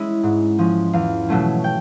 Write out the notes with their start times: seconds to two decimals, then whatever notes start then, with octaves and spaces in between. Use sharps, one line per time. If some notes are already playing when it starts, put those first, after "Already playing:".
Already playing: G#3 C#4 E4
0.23 G#2
0.59 F3 G#3 C#4
0.93 E2 F5
1.29 B2 F#3 A3 C#4
1.64 G5